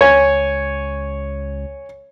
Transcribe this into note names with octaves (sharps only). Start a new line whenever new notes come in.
C#2 C#5 G#5